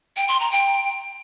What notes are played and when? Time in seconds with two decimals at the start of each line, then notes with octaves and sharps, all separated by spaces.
0.17 G5
0.28 C6
0.40 A#5
0.52 G5